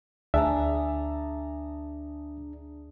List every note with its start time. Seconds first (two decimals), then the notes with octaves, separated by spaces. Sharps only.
0.34 D2 D4 G#4 E5 A5 A#5